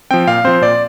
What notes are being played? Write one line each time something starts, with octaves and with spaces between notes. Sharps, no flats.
F3 C4 G5
A#2 F5
F3 C4 C5
A#2 D5